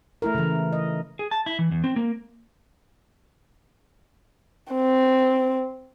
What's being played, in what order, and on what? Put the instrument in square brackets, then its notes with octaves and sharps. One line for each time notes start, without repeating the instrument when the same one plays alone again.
[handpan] A3 E4 A#4
C#3 E3
D#5
[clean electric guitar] G#4
A5
E4
E3
E2
C4
A#3
[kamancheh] C4